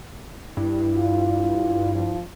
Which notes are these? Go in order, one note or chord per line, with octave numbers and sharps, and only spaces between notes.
G2 E4
F4
F3